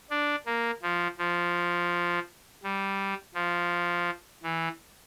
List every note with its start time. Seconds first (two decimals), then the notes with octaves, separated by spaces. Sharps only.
0.10 D4
0.46 A#3
0.83 F3
1.18 F3
2.63 G3
3.35 F3
4.43 E3